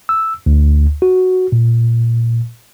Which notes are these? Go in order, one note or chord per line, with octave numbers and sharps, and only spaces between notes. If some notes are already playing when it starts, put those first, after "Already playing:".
E6
D2
F#4
A#2